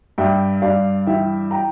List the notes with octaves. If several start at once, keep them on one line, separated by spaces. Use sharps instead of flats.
G2 E5 G5
G2 D5 F5
E3 E5 G5
G5 A#5